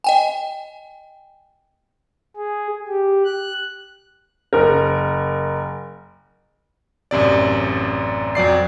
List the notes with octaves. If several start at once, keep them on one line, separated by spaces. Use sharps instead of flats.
D#5 G5 G#5
G#4
G4
F#6
F#1 A#4
A1 F#2 C3 D5
F2 F#3 D5 C7